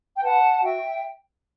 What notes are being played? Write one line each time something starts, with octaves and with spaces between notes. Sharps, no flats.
G5
B4 F#5 A5
F#4 E5 G5